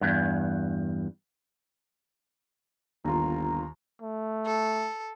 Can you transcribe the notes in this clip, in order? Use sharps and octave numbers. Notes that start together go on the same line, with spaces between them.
E2 G2
G1 D#2 F4 A#5
A3
A4